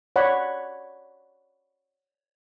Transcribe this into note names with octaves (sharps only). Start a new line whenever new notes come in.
C#5 D5 F#5 B5